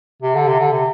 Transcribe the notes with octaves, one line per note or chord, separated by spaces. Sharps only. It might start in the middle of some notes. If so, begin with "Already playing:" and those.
C3
D3
C3
D3
C3